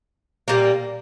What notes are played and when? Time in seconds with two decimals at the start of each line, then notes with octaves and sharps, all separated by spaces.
0.48 A#2 G3 A#3